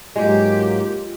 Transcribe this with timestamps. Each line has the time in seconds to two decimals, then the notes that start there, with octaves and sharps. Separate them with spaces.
0.16 G#2 F#3 G#3 A#3 F4 G4